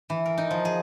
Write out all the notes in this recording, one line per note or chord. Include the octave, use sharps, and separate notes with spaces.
E3
A#4
D#4
F3
G#4